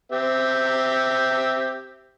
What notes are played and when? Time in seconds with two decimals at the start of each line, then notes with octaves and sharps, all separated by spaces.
0.12 C4 G4 E5